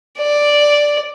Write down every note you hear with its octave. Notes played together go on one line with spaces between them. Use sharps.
D5